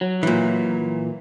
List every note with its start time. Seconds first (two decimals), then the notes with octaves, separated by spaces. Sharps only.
0.01 F#3
0.23 A#2 E3